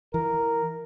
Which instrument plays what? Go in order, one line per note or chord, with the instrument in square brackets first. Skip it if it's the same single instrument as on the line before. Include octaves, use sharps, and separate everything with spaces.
[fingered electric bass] E3 [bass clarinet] A#4